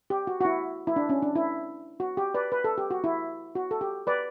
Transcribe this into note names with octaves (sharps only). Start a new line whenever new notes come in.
G4
F#4
F#4
E4
E4
D4
C#4
D4
E4
F#4
G4
B4 D5
B4
A4
G4
F#4
E4
F#4
A4
G4
B4 D5